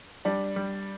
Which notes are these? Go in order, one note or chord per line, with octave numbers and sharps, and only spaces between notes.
G3 D4
G3